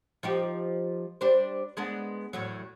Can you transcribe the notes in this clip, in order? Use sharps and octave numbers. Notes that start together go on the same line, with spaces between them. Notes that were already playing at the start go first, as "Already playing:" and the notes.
F3 D#4 G4
G3 D4 C5
G#3 B3 D4
E2 A2 F#3